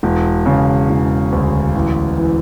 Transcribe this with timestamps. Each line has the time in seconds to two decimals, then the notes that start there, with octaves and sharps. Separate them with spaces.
0.03 E1
0.46 C#3
0.90 E1
1.32 D2
1.75 A1
2.18 E3